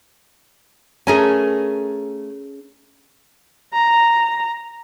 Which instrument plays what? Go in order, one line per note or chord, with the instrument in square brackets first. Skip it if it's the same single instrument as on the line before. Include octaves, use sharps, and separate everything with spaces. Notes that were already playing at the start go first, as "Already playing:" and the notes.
[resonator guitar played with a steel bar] A3 A#4 G#5 [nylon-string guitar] C#4 G#4
[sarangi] A#5